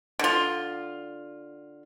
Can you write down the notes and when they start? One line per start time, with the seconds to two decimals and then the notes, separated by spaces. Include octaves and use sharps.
0.19 D3 F4